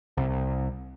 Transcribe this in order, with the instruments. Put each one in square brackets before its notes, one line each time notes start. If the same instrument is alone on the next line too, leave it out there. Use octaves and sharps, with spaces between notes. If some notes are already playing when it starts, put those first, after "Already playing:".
[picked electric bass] C2